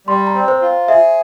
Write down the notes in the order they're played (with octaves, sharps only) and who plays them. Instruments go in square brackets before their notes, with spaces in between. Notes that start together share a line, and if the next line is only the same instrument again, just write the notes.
[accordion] G3 [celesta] C6
[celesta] A#5
[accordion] C4
[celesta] C5
[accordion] F4
[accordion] G#4 [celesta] E5